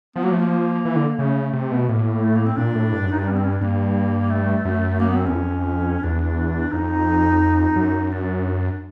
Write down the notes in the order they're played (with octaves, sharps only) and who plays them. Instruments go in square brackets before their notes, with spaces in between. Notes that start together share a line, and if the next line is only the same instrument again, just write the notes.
[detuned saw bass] F3 [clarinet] B3
[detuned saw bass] F#3 [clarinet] A#3
[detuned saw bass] F3 [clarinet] A3
[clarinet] A#3
[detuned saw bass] E3
D3
[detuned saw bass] C#3 [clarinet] A3
[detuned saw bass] C3
B2
[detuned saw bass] A2 [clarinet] A#3
[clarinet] A3
A#3
C4
[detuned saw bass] A#2 [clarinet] D4
[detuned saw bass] A2
G2
F#2
[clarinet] D#4
[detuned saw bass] G2 [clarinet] D4
[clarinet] C#4
B3
C4
C#4
D4
[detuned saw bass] G2 [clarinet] A#3
[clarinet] A3
[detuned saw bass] F#2
[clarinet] A#3
B3
C4
[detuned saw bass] E2 [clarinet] C#4
[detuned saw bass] F2
[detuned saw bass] E2 [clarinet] D4
[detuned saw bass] F2 [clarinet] D#4
[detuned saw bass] F#2
[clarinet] D4